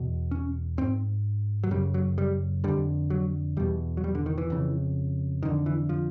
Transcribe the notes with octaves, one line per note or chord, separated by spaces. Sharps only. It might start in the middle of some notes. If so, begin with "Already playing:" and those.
Already playing: E2 B2
C#4
G#2 C4
F#3
F#2 C#3 G3
F#3
G3
F2 D3 G3
F#3
E2 B2 G3
F#3
G3
D3
D#3
E3
F2 C#3
F2 D3 D#3
E3
F3